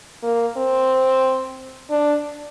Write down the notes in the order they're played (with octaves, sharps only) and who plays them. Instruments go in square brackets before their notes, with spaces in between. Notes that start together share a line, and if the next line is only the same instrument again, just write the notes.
[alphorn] A#3
C4
D4